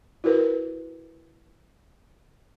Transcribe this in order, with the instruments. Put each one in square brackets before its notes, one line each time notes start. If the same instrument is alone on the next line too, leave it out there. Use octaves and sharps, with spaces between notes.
[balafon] E4 F#4 A#4 B4